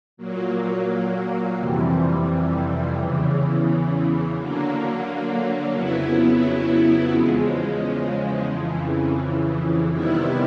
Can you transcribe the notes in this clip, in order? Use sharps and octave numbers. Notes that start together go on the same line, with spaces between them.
A#2 F#3 A#3
F2 C3 E3 G3
E2 C#3 E3
D3 F#3 A#3
F2 C#3 F#3 B3 E4
E2 C#3 F3 G#3
F2 C#3 E3
C3 D#3 G3 B3 E4